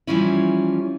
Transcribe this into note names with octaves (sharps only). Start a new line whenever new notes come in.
E3 F3 G3 C#4 E4